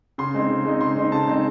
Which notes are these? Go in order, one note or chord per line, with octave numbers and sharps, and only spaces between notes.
C#3 C6
G#3 C4 D#4
C#3
G#3 C4 D#4
C#3 C6
G#3 C4 D#4
C#3 A5
G#3 C4 D#4